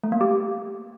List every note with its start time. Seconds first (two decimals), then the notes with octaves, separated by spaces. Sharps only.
0.03 A3
0.12 A#3
0.21 G4